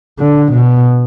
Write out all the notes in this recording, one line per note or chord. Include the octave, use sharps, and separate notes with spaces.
D3
B2